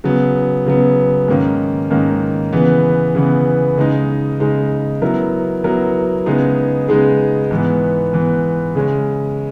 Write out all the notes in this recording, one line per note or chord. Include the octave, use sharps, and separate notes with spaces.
C#3 F#3 B3
C#3 F#3 B3
G#2 D#3 A#3 C#4
G#2 D#3 A#3 C#4
C#3 E3 B3
C#3 E3 B3
C#3 G#3 D#4
C#3 G#3 D#4
F#3 B3 E4 A#4
F#3 B3 E4 A#4
C#3 G#3 B3 D#4 G#4
C#3 G#3 B3 D#4 G#4
G#2 E3 B3
G#2 E3 B3
C#3 G#3 C#4